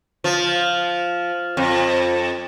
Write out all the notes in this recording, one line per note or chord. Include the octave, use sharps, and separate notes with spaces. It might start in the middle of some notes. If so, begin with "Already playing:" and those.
F3
F2